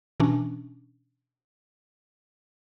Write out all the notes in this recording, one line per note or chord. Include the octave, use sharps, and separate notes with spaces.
B2 E3 C#4 D4